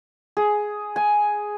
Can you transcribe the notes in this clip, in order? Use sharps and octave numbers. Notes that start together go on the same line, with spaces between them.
G#4
G#5